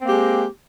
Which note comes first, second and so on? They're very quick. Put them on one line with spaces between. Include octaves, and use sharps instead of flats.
C4 A#3 G4 G#3